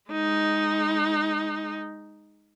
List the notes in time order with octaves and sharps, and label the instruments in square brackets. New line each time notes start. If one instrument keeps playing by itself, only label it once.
[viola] G#3 D#4